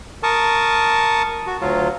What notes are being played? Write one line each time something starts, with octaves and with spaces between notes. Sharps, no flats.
A#4 A5 C#6 D#6
F#4
D2 F#3 F4